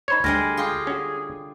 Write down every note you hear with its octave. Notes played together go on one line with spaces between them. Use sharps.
D#4 C5 C#5 B5 G#6
D2 D3 G3 G#3 G#5 F6 A#6
F4 G4 G#4
C#4 F#4